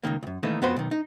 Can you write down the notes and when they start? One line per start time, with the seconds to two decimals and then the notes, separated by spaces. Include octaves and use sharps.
0.04 C#2 G2 D#3 A#3
0.23 C2 F#2
0.43 D#3 E3 A3 A#3 D#4
0.62 F2 B3 F#4 C5 B5
0.76 B1 D#3
0.91 D#4